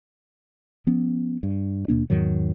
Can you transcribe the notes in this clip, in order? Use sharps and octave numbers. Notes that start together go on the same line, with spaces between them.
F3 B3 C#4
G2
D#2 B2 A#3 D4
E2 G#2 D#3 F#3